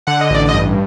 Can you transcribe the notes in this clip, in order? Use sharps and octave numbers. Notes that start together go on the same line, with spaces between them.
D3 F#5
D#5
A1 D5
D#5
G2